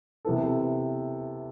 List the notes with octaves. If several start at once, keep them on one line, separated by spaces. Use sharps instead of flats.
C3 E3 B3 E4 A4